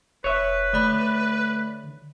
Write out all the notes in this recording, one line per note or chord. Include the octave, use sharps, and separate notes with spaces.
F1 B4 C#5 E5
D3 A3 D5 B5